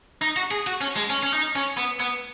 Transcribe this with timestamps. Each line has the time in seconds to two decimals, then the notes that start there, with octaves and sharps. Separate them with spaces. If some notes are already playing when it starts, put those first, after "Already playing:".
0.22 D#4
0.36 F#4
0.51 G#4
0.67 F#4
0.81 C#4
0.96 G#3
1.10 C#4
1.23 C#4
1.33 D#4
1.55 C#4
1.77 B3
2.00 B3